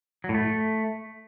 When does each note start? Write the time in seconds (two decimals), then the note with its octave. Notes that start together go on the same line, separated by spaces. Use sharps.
0.24 F#3
0.29 A2
0.34 A3